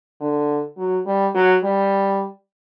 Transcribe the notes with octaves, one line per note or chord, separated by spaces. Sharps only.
D3
F#3
G3
F#3
G3